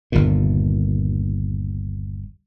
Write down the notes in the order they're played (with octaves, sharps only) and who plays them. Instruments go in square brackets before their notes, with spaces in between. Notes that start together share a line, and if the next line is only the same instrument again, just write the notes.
[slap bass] G1 D#2 A#2